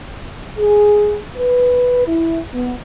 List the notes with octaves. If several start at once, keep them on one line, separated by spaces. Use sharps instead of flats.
G#4
B4
E4
B3